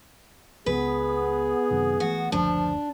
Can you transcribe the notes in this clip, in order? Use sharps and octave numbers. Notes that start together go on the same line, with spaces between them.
C#2 B3 G#4 B4
F#2 C3 D#3
E3 A3 F#4
F#1 D2 F3 D4